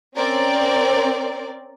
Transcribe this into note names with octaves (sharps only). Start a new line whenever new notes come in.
C4 C#4 A#4 D5